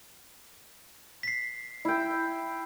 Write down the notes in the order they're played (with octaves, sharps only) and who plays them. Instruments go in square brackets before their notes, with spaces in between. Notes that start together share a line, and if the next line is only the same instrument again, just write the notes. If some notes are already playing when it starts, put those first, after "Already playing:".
[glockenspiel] B6 C7
[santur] E4 G5